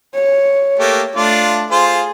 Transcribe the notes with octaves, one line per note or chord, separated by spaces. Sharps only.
C#5
A3 A#3 G4
A3 D4 F4 D5
F4 G#4 C5